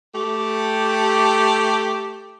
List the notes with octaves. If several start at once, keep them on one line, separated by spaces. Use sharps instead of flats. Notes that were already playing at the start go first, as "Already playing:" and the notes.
A3 G4